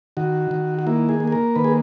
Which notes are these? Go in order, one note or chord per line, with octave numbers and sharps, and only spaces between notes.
D#3 F#4
D#3
F#4
A#3 E4
G#4
A#3
G#4
A#4
D#3 B4
G#4